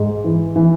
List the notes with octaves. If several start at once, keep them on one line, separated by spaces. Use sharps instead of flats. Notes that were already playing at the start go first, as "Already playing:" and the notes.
Already playing: G#2
E3
E3